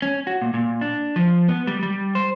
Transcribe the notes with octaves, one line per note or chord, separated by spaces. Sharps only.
C#4
F#4
A#2
A#2
D4
F3
B3
G3
G3
C5